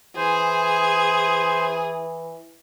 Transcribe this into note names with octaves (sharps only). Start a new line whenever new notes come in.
E3 G#4 C5